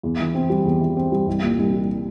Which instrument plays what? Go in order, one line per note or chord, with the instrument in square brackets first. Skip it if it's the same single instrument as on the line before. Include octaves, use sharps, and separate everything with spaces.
[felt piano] E2
E3
C4
G3
E2
E3
C4
G3
C2
A#2
C2
G3